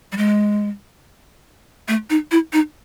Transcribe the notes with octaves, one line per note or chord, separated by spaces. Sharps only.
G3
G#3
A3
D#4
E4
D#4